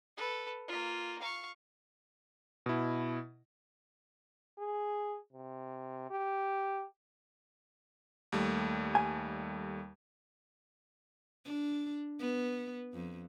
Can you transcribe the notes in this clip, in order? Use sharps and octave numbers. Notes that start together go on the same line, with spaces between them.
A4 B4
A#3 F4
F5 C#6
B2 E4
G#4
C3
G4
D#2 G3 A3
G#5
D4
B3
F2